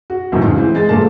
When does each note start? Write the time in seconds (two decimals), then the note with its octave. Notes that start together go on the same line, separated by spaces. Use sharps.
0.10 F#4
0.32 F2 A2 C3 D#3 E3 F#3
0.44 C#2
0.57 E3 C4
0.75 G#3 A6
0.89 G1 A#2 A3 A#4 A5